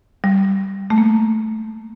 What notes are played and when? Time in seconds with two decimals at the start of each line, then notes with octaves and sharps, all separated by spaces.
0.24 G3
0.90 A3
0.98 A#3